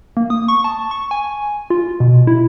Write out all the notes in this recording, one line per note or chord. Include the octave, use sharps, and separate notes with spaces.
A#3
D#6
C#6
A5
C#6
G#5
F4
B2
E4